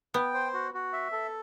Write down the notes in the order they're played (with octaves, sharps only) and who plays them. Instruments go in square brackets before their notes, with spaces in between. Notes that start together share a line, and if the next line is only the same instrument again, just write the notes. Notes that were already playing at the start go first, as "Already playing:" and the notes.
[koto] B3 [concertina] G5
[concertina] C5
F#4
F#4
E5
A4